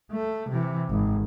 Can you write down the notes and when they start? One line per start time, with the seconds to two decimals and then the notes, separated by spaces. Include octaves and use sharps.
0.12 A3
0.49 C3 E3
0.90 G#1